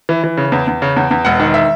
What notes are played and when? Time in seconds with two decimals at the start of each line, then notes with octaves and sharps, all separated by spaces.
0.09 E3
0.24 E3
0.37 C#3
0.52 E2
0.67 E2
0.82 C#3
0.96 E2
1.11 E2
1.25 E1 F#5
1.40 D#3
1.54 E5